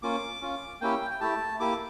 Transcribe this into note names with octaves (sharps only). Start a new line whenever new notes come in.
A#3 C#4 F4 D6
C#4 F4
A#3 C#4 E4 G4 G5
G5
A3 E4 G4 A5
A#3 E4 G4 D6